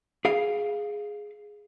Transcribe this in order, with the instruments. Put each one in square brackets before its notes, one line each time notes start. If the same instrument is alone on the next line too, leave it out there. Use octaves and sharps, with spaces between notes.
[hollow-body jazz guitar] G#4 F5